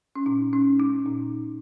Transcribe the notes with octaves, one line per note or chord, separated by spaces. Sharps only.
C#4
A#2 D#4
C#4
G#3
D#4
A#2